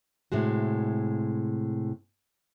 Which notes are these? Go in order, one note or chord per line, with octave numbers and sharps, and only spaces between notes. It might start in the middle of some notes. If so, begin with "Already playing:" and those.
A2 C3 G#3 F#4